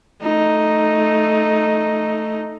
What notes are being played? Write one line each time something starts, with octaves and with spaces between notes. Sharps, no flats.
A3 D#4